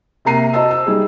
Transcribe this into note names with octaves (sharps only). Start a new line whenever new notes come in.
C3 A#3 A#5 C7 D#7
F#4 C5 D#5 A5 E6
E6
G3 D#4 G#4